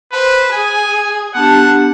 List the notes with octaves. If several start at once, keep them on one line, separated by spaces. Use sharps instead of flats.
B4 C5
G#4 G#5
B3 D4 G4 F#5 A5